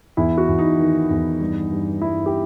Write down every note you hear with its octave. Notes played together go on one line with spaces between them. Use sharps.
E2 E4
F#4
E2
D#4
D#3
E2
G2
G2
G2 E4
G4